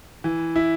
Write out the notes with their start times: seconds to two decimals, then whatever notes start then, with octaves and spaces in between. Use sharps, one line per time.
0.24 E3
0.56 E4